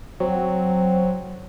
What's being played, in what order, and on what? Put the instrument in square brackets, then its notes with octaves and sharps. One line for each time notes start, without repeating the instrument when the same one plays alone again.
[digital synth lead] F#3 [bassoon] C4